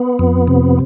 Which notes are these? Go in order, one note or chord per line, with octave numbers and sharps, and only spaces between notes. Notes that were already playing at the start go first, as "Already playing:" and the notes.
Already playing: B3
F2
C3